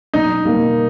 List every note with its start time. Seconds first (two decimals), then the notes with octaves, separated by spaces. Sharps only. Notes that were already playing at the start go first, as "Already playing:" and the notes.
0.14 B1 D#4
0.45 B2 G3 A#3 D#4